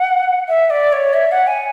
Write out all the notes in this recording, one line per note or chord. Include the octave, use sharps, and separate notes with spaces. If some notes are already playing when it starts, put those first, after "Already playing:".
Already playing: F#5
E5
D5
C#5
E5
F#5
G#5